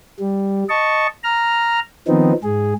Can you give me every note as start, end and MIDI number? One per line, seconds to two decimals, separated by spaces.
0.20 0.64 55
0.69 1.07 75
0.69 1.07 81
0.69 1.07 85
1.24 1.80 82
1.24 1.80 89
2.08 2.33 51
2.08 2.33 53
2.08 2.33 59
2.08 2.33 60
2.08 2.33 63
2.43 2.74 44
2.43 2.74 68